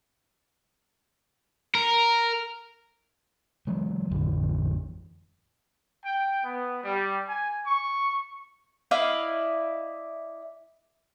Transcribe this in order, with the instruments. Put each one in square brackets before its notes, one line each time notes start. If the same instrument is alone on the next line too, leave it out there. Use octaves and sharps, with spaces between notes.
[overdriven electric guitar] A#4
[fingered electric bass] E3 F#3 G#3
A1 F2 D3 E3
[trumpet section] G5
B3
G3
G#5
C#6
[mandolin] E4 D5 D#5 F5